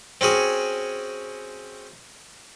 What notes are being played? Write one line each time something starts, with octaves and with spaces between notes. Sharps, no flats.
C4 C#4 F#4 G#4